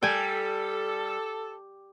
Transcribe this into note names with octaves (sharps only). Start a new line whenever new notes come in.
G3 A4 G5 G#5